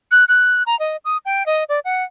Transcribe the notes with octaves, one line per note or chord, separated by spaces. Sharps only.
F#6
F#6
A#5
D#5
D#6
G5
D#5
D5
F#5